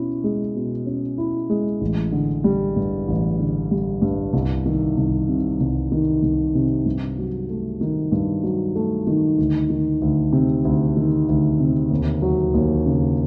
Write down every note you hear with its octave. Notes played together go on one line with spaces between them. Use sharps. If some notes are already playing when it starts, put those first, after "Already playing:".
Already playing: B2 C#4 E4
G#3
B2
C#4
E4
G#3
A1
D3
G3
G2
A1
D3
G3
G2
C2
D#3
C2
C3
C2
D#3
C2
C3
G2
F#3
A3
D#3
G2
F#3
A3
D#3
D2
D#3
D2
C3
D2
D#3
D2
C3
D#2
F#3
D#2
C#3